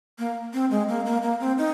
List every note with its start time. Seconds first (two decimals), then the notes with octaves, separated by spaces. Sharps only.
0.19 A#3
0.53 C4
0.71 G#3
0.89 A#3
1.06 A#3
1.23 A#3
1.40 C4
1.58 D#4